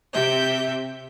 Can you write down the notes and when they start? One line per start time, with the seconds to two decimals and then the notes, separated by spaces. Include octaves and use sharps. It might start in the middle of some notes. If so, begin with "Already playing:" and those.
0.14 C3 C4 G4 E5 G6